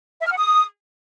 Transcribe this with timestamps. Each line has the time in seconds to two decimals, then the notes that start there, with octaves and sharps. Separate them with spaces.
0.21 E5
0.27 F6
0.32 F#5
0.38 D#6